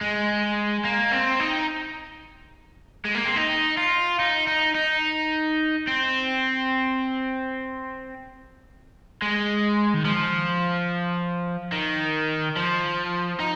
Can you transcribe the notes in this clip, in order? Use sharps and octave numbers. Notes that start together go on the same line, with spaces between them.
G#3
A#3
C4
D#4
G#3
A#3
C4
D#4
F4
D#4
D#4
D#4
C4
G#3
D#3
F3
D#3
F3
D#4